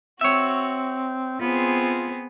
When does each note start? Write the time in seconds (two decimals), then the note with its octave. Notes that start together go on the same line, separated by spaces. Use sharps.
0.21 C4 F#4 C#5 E5
1.40 B3 C4 F4 G#4